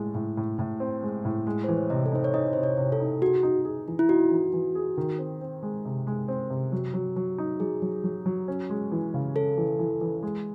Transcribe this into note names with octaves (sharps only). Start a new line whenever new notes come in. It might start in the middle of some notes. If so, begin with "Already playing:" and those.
Already playing: A2 G#3
A2
A2
A2
C4
G#3
A2
G#3
E3 C5
C#5
C3 D#5
A4
D#4 C5
C#5
D#4 D#5
C3 C5
C#5
C3
A4
D#4
F#4 G#4
D#4
G#4
E3
E4
D#4 F#4
E3
E3
G#4
D#3
C4
C4
G#3
C3
G#3
C4
C3
F#3
F#3
F#3
D#4
F#3 G#4
F#3
F#3
F#3
C#4
G#3
E3
C#3
C#4 A4
E3
E3
E3
G#3